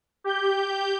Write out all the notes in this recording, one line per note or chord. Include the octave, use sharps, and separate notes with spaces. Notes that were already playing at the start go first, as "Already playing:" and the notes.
G4 G6